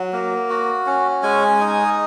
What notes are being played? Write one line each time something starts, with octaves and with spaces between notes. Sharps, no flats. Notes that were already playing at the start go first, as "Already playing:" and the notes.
Already playing: F#3
A#3
F#4
C#4
G#3 G#5
D#4